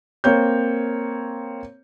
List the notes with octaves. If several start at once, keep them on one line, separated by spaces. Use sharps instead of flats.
A#3 C4 C#5 G6